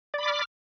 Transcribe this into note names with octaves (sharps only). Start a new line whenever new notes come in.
D5 B5 D6 F6